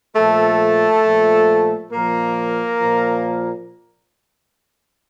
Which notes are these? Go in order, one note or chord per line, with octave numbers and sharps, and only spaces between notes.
A#2 F3 A3 A4
A#2 F3
A#2 F3 A#3 A#4
A#2 F3